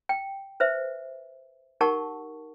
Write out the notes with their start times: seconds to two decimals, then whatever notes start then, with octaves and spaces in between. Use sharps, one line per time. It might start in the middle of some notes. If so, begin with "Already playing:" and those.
0.09 G5
0.60 B4 C5 E5
1.81 D#4 G4 A#4 F#5 A5 C#6